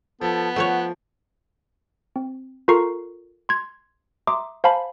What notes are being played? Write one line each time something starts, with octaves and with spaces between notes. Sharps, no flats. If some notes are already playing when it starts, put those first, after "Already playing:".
F3 B3 A4
F3 A3 A4 C#5 F#5
C4
F4 A4 A#4 A#5 C#6 C7
C6 G#6
E5 A#5 C6 D6 D#6
C5 F5 G#5 A5 B5